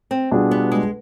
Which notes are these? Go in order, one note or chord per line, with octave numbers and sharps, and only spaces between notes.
C4
B2 G3 D4 F4 G#4
B3
G#3